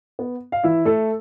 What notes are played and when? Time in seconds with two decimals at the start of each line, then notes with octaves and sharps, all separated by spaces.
0.19 B3
0.52 F5
0.64 E3 E4 E5
0.85 A3 A4